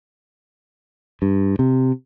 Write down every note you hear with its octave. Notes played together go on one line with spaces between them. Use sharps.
G2
C3